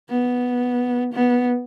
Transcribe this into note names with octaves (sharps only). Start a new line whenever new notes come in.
B3
B3